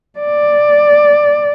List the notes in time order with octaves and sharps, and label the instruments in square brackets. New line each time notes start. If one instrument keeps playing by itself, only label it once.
[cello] D5